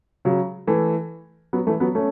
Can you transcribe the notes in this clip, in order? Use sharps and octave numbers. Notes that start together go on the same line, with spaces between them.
C#3 F#3
E3 A3
F#3 B3
E3 A3
F#3 B3
A3 C#4